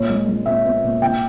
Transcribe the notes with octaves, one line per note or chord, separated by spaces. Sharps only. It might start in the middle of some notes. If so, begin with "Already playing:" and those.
Already playing: A#2 C#5
G#3
G#3
A#2 E5
B3
A#2
A#2 G5